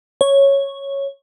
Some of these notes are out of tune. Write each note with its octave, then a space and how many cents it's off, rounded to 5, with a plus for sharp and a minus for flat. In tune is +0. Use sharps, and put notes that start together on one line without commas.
C#5 -5